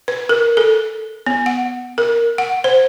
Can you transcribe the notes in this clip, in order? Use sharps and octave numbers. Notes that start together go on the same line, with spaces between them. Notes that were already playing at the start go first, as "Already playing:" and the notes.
B4
A#4
A4
B3
F#5
A#4
F#5
C5